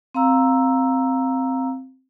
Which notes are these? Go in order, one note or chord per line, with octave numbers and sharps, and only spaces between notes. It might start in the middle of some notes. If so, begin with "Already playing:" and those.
C4 F5 A#5 E6